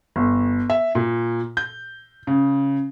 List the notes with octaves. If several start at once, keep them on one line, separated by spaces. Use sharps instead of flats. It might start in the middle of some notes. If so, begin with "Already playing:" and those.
G1
E5
A#2
G6
C#3